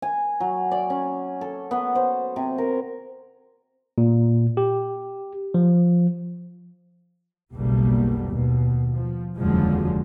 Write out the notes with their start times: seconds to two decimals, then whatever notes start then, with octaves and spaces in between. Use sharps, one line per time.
0.02 G#5
0.40 F#3
0.71 D5
0.90 C#4
1.41 A4
1.71 B3
1.95 C5
2.36 C3
2.58 A#4
3.98 A#2
4.57 G4
5.54 F3
7.53 F#1 B1 B2 G3 A3 A#3
8.29 D#2 B2
8.94 F3
9.38 F1 D#2 D3 F3 F#3 G#3